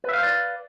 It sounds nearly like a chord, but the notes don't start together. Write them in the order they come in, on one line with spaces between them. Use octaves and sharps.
B4 E5 F5 C5 D5